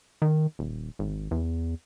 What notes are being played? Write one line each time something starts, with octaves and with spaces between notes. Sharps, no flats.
D#3
D#1
G#1
E2